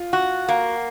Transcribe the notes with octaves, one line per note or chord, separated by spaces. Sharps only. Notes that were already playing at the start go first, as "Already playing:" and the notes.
Already playing: F4
F#4
A#3